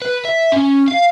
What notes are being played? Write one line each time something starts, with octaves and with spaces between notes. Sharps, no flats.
B4
E5
C#4
F5